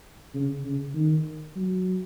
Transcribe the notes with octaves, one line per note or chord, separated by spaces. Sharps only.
C#3
C#3
D#3
F#3